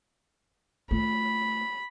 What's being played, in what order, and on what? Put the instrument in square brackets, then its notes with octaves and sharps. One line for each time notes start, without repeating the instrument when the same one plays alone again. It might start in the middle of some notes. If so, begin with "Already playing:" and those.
[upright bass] A3 F4 [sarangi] B5